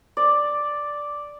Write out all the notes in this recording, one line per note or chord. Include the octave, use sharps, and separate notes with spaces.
D5